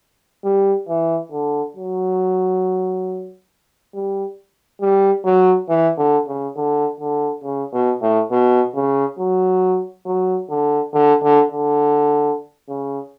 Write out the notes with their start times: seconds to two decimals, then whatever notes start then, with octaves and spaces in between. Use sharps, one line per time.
0.44 G3
0.88 E3
1.32 D3
1.76 F#3
3.94 G3
4.81 G3
5.25 F#3
5.69 E3
5.98 D3
6.28 C#3
6.57 D3
7.00 D3
7.44 C#3
7.73 B2
8.02 A2
8.31 B2
8.75 C#3
9.18 F#3
10.06 F#3
10.50 D3
10.93 D3
11.23 D3
11.52 D3
12.69 C#3